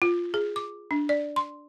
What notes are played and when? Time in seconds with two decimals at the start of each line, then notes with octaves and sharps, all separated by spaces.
0.02 F4
0.34 G#4
0.56 D6
0.91 D4
1.09 D5
1.36 C6